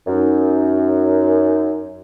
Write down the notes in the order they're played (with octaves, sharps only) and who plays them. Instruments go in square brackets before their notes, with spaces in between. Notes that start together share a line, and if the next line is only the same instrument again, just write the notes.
[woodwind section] F#2 D#4